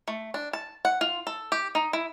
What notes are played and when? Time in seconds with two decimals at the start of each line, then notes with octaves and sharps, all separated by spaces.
0.08 A3
0.34 D4
0.53 A5
0.85 F#5
1.01 F4
1.27 A4
1.52 G4
1.75 D#4
1.93 E4